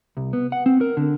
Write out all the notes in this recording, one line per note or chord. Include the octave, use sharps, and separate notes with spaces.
C2
B3
F#5
C4
A#4
D3